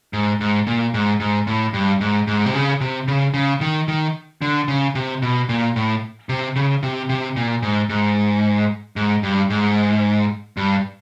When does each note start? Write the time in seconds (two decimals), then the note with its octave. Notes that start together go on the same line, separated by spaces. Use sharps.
0.13 G#2
0.40 G#2
0.67 A#2
0.94 G#2
1.20 G#2
1.47 A2
1.73 G2
2.01 G#2
2.27 G#2
2.46 C3
2.54 C#3
2.80 C3
3.08 C#3
3.34 C#3
3.61 D#3
3.88 D#3
4.42 D3
4.68 C#3
4.95 C3
5.22 B2
5.49 A#2
5.76 A2
6.29 C3
6.56 C#3
6.83 C3
7.09 C3
7.36 A#2
7.62 G#2
7.89 G#2
8.96 G#2
9.23 G2
9.50 G#2
10.57 G2